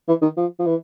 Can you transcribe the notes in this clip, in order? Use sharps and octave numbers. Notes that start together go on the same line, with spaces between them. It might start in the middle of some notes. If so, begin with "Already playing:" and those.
E3
D#3
F3
F3
E3